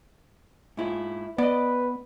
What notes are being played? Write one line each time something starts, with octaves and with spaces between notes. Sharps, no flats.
G#2 E4 F4
B3 B4 D5 D#5